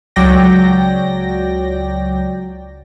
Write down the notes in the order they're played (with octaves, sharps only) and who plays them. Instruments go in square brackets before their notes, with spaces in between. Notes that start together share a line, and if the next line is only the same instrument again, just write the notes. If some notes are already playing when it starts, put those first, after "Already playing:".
[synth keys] C#2 F#3 D5 G5 A#6